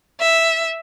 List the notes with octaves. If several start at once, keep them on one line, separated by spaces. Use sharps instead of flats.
E5